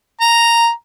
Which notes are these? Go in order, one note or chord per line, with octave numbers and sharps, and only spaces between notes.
A#5